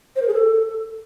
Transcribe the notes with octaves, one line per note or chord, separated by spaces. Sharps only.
C5
A#4
G#4
A4